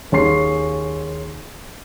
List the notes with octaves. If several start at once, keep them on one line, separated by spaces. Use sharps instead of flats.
D#2 C#4 G#4 C6 C7